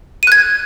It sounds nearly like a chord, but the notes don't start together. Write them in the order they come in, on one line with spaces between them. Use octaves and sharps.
D#7 F#6 G#6